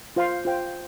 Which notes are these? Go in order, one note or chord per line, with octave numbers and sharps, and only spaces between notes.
F4 C5 F5 C6
F4 C5 G5